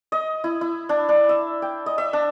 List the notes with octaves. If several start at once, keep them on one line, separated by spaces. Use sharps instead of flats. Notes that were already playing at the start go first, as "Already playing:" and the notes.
D#5
E4
E4
D4
D4
E5
G5
D#5
E5
D4